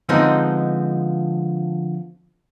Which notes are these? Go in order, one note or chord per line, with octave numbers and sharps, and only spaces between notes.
D3 F3 G#3 B3 C4 D#4